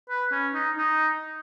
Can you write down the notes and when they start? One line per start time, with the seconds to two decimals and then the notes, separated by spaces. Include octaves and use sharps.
0.10 B4
0.32 C#4
0.54 D#4
0.77 D#4